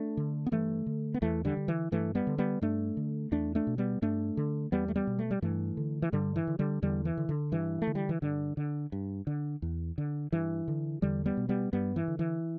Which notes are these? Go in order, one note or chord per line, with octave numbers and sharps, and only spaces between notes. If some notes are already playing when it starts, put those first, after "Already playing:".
Already playing: A3 D4
D3
B3
G2 E3 A3
D3
B3
E2 E3 A3
D3 G3
D3
E3
G2 E3 A3
G3 B3
D3
G3 B3
G2 A3 D4
D3
E2 A3 D4
A3 D4
B2
G3 B3
G2 A3 D4
D3
E2 G3 B3
A3
G3 B3
B2
A3
G3
G2 E3 A3
D3
E3
G2 D3 G3
E3
D3
D3 G3
E2 D3 G3
E3
D3
D3
G2 E3
A3
D3
G3
E3
G2 D3
D3
G2
D3
E2
D3
G2 E3
D3
E2 D3 G3
G3 B3
B2
G3 B3
G2 G3 B3
E3
D3
E3